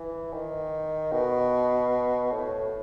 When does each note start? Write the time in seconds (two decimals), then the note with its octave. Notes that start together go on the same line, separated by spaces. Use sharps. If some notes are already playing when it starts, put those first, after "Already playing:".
Already playing: E3
0.33 D#3
1.13 B2
2.32 A2